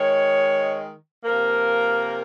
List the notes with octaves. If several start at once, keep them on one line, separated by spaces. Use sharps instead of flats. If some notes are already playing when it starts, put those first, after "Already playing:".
Already playing: D#3 G#3 C#5
C3 F3 A#3 A#4